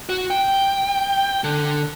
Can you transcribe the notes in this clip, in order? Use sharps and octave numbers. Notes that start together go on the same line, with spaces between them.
F#4
G5
D3